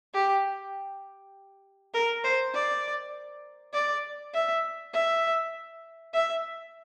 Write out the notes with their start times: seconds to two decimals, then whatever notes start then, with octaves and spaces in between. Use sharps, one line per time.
0.14 G4
1.94 A#4
2.24 C5
2.54 D5
3.73 D5
4.34 E5
4.94 E5
6.14 E5